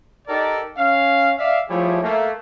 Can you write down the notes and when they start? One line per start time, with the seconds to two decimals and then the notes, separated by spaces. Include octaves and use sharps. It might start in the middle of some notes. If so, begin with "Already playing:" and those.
0.28 D#4 G4 A4 A#4 D5
0.77 C#4 F5
1.37 D5 E5 F5
1.70 F3 G3 A3 E4 G#4 C#5
2.02 A3 A#3